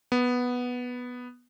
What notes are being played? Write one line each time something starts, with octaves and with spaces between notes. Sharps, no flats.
B3